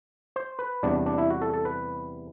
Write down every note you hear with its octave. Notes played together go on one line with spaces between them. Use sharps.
C5
B4
E2 C3 G3 B3 D4
D4
E4
F#4
A4
A4
B4